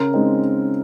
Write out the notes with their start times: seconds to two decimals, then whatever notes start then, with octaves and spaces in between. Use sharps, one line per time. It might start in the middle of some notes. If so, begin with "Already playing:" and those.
Already playing: C#3 A#4
0.14 G#3 C4 D#4